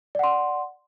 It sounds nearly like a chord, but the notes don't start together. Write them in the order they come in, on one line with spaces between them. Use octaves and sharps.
D5 F#5 C6